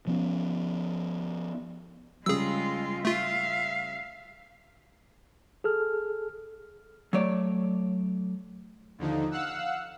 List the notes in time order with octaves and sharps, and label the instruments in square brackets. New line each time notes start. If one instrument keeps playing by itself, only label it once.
[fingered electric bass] F3 B3 C#4
[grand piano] C#3 G3 [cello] G#3 F4 [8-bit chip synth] G#4 E6
[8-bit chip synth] A3 F4 [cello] E5 F5
[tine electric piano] G#4 A4 F6
[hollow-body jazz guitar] F#3 A3 C#5 D5
[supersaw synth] D#2 D3 F3 D#4
F5 F#5 E6 F#6